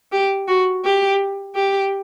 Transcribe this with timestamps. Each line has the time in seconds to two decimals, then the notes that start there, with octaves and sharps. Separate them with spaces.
0.12 G4
0.48 F#4
0.85 G4
1.55 G4